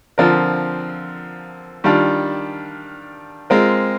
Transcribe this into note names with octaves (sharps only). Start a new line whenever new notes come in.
D3 F3 C4 F4 A#4
D#3 G3 D4 F4
G#3 C4 F4 A#4